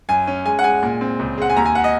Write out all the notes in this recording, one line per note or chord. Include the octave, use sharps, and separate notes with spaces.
F#2 G#5
C#4
G#3 G#5
F#5
G#3 G#5
A#2
C4
C#2
G#3 F#5
G#5
D#2 A#5
G#5
F#5
D#5